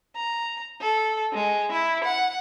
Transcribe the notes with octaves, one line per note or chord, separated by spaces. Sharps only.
A#5
A4
G#3
E4
F#5